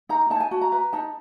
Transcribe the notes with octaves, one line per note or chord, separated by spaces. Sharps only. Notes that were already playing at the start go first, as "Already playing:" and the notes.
D#4 A#5
D#4 A5
G#5
F#4 A5
A#5
B4 A#5
D#4 A5